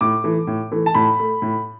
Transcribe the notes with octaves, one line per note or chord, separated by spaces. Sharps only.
A2 D6
E3 A3
A2
E3 A3
A5
A2 B5
A3
A2